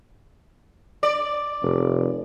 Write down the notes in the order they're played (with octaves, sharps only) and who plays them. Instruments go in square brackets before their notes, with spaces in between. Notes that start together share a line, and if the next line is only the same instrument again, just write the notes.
[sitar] D5
[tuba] F1